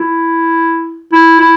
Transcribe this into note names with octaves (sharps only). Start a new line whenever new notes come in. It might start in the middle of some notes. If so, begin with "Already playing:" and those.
Already playing: E4
E4
E4